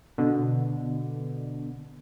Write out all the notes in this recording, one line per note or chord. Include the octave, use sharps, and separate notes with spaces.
B2 D3